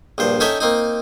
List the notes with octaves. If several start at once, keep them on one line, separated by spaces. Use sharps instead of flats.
A#1 G2 C5
C#4 D#4 A4 C#5 E5 G5
A#3 C4 D#4